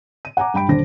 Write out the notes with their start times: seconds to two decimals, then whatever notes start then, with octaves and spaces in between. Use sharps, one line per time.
0.25 D#7
0.37 F#5 G#5 A#5 D6
0.54 G2 G5 B5 D7
0.68 D#1 D3 D4 C5 A#6